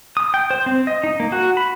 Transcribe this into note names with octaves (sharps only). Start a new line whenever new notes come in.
D#6
G5
C5
C4
D#5
D#4
A#3
F#4
B5